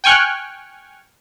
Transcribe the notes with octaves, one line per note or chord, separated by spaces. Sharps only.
G5 G#5 C#6 F6 F#6